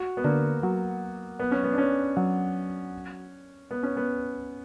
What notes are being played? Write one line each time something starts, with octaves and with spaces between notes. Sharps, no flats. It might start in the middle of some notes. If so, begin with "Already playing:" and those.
Already playing: F#4
B3
D3 A#3
F#3
B3
C#4
B3
D4
C#4
F#3
B3
C#4
B3